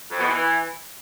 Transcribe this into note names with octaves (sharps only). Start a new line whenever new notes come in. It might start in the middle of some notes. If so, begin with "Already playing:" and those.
F2
B2
E3